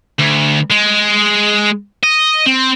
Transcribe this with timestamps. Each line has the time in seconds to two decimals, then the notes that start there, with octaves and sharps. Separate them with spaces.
0.19 D2
0.71 G#3
2.03 D#5
2.46 C4